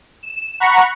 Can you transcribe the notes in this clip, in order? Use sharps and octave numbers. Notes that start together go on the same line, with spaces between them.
E7
F#5 A#5 B5 C#6